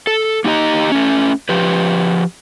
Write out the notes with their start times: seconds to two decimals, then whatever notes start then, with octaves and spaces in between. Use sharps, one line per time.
0.07 A4
0.44 A#3 D#4 G4 D#5 A#5
0.92 A3 C#4
1.49 F3 G4 B4